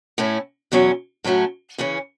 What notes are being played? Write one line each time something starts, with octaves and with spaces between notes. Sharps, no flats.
A2 A3 C#4 E4
E2 B2 F#3 C#4
A2 F#3 A3 C#4 F#4
C#3 E3 C#4